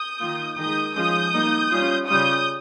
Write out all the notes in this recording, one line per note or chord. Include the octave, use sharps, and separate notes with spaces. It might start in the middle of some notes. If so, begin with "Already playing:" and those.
Already playing: D#6 G6
D#3 A#3 F4
D#3 G#3 D#4 D#6 G6
F3 G#3 C#4 F4 D#6 G6
G3 A#3 D#4
G3 C#4 F4
C#3 G3 C#4 F4 D#6 G6